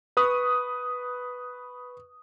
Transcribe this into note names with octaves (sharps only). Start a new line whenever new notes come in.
B4 C#6 D#6